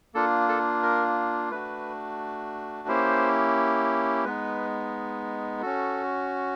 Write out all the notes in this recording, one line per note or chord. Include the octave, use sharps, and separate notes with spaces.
A#3 D4 F4 A4
A4
A#4
A3 D4 F#4 B4
A#3 C#4 E4 G4 C5
G#3 B3 D#4 B4
C#4 F#4 A4